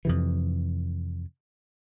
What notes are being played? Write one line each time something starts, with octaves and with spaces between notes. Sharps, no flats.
F2 C3 E3